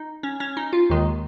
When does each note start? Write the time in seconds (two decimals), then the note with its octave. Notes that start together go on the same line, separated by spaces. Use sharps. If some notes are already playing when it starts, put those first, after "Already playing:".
Already playing: D#4
0.23 C#4
0.40 C#4
0.57 D#4
0.73 F4
0.90 D#2 D#3 G#3